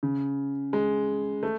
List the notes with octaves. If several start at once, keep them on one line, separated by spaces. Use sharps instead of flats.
C#3
G#3
A3